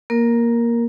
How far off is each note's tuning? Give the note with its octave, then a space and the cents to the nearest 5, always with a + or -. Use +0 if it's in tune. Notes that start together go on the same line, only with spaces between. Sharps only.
A#3 +10 A#4 +0